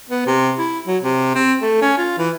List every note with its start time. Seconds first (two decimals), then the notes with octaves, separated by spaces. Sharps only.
0.10 B3
0.27 C3
0.59 E4
0.87 F#3
1.03 C3
1.35 C4
1.62 A3
1.82 C#4
1.98 F4
2.18 E3